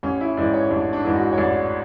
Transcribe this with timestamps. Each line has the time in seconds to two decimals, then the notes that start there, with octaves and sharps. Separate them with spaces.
0.03 A1 C#4
0.21 E4
0.37 G#2 E3 D5
0.54 C#5
0.71 A1 D4
0.93 D4
1.04 G#2 E3
1.15 F#4
1.33 C#5
1.38 A1 D5